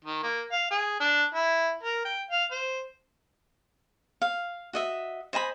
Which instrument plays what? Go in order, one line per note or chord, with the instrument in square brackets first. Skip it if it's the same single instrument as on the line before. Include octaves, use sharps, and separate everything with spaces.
[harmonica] D#3
A#3
F5
G#4
D4
E4
A#4
G5
F5
C5
[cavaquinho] F5
F#4 D#5 E5
C5 D#5 G#5 B5